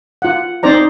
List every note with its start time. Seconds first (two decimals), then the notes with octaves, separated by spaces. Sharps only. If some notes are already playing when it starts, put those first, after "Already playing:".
0.22 F4 F#5
0.63 C4 D#4 C5 D5 A#5